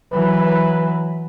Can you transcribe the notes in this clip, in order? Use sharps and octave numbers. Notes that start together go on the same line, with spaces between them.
E3 F#3 B4